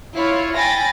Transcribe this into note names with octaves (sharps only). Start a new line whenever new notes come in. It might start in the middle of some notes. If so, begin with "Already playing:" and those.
E4 F4 C#5
G5 G#5 B5 A6 A#6